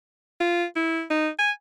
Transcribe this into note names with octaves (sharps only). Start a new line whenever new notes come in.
F4
E4
D#4
G#5